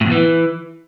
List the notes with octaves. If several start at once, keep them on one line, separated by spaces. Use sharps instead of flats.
A2
E2
E3